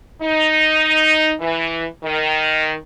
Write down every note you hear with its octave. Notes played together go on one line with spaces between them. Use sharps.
D#4
E3
D#3